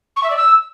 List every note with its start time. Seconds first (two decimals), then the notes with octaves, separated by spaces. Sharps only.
0.16 C#6
0.23 E5
0.30 D5
0.37 E6